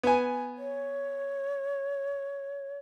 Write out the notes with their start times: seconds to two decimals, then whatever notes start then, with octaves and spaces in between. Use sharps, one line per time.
0.03 B3 G#5
0.58 C#5